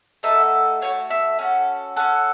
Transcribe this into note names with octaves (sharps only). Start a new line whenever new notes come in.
A3 D#4 F#4 A4 E5
A3 D#4 F#4 A4 C#5
E5
C#4 F#4 A4
C#4 F#4 A4 F#5